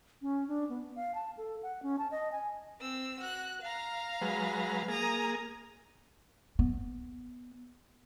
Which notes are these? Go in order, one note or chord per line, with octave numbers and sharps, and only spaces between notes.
C#4
D4
B3
F5
A5
A4
F#5
C#4
A5
D#5
G#5
C4 E6
F#4 F#6
F5 A#5
F#3 G#3 B4
A#3 G#4 A#5 D#6
B3